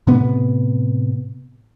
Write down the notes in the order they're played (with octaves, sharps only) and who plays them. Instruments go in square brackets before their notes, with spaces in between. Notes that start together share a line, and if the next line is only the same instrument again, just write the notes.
[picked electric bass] A2 C3 B3